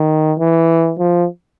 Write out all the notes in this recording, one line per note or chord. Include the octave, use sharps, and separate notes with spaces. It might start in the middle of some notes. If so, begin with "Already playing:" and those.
Already playing: D#3
E3
F3